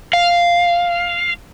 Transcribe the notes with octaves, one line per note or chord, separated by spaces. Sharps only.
F5